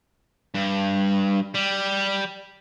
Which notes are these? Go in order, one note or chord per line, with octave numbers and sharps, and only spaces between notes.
G2
G3